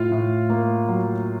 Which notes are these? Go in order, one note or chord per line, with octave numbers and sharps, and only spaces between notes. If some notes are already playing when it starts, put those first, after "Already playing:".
Already playing: A2 F4 F5
A2
A#3
F#3